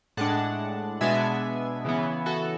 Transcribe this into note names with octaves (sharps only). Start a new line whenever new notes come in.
A2 G#3 D4 F#5 A5
B2 G#3 B3 D4 E5 G#5
C#3 E3 B3
F#4 A4